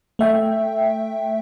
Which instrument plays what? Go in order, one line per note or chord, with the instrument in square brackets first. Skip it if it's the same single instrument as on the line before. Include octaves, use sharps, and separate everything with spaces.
[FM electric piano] A3 E5 G5